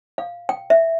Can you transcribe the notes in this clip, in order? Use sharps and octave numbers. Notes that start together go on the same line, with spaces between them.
F5
G5
E5